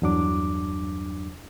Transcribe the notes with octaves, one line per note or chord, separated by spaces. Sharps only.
E2 G2 F#3 D4 D6